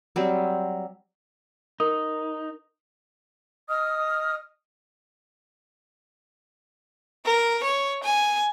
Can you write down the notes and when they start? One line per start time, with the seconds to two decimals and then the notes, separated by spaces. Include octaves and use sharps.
0.16 F#3 G3 C4
1.80 D#4 A#4 D#6
3.67 D#5 D#6 F6
7.25 A#4
7.64 C#5
8.03 G#5